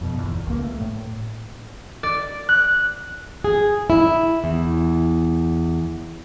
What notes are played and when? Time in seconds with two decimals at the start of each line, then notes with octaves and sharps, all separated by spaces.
0.01 F2 B2
0.19 G1 E2
0.47 C#2 A#3
0.63 A3
0.81 A2
2.03 D5
2.49 F#6
3.44 G#4
3.90 E4
4.44 E2